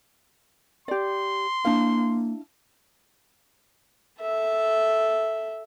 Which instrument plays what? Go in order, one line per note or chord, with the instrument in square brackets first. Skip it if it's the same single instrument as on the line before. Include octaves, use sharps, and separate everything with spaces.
[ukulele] G4 D5 [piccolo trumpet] C6
[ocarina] A#3 [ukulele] D4 E4 F5
[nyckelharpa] A4 E5